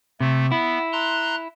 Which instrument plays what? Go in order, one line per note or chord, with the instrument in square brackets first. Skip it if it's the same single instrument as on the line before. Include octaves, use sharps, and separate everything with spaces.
[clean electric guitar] C3 [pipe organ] A3
[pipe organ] B3 [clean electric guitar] E4
[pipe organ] A#5 C6 F#6